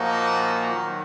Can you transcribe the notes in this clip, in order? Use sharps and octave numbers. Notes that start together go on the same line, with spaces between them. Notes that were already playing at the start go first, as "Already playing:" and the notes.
Already playing: A#2 F3 A#3 D#4 F#4
D#3 F#3